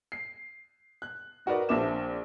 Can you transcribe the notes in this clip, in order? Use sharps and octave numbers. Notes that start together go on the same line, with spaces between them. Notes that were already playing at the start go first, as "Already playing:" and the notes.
C7
F#6
D#4 F#4 A#4 B4 D5
A#1 C4 D4 E5 D6 E7